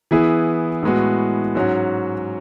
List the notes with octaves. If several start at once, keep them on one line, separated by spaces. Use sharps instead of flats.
E3 B3 E4 G#4
A2 G#3 B3 F#4
G#2 F#3 C#4 F#4